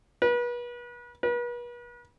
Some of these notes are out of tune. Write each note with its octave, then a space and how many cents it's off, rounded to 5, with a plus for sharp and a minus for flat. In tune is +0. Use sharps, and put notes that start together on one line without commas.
B4 -35
B4 -40